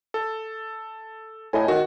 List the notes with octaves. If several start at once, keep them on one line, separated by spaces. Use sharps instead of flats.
A4
A2 D#5 G#5
D#3 F#4